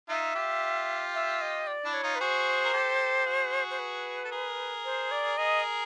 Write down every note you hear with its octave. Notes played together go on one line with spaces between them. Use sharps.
D#4 F4 E5
F4 G4
E5
D#5
D5
D4 E4
C#5
D#4 F4
B4
F#4 G#4 C5
A#4
G4 A4
F#4 G#4
C5
B4
A4
G#4 A#4
C5
D5
G#4 A#4 D#5